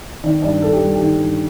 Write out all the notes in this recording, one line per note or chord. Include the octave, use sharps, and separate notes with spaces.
D#3 D5
G2 D5
G2 A4
G4
G3
G4
D#3
G2